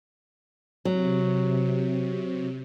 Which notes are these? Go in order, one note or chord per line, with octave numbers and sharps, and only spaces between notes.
C3 F#3